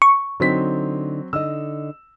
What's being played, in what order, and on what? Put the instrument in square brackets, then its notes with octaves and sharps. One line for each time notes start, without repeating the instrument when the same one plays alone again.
[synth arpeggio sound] C#6
[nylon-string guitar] D3 D#4 [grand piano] F#3 C4 B6
[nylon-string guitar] D3 D#4 D#5 [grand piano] E6